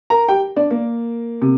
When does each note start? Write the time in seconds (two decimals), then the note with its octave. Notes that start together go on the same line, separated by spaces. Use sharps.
0.10 A#4 A#5
0.28 G4 G5
0.56 D4 D5
0.71 A#3 A#4
1.42 C3